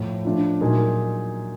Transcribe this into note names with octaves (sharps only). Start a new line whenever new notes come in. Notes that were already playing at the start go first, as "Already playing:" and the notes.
Already playing: A2 F3 A3
F3 A3 D4 F4
A#2 F#3 A#3 D#4 G#4